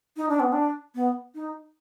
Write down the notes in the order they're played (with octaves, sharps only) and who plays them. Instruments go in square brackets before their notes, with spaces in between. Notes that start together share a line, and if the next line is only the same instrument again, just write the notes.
[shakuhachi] D#4
D4
B3
D4
B3
D#4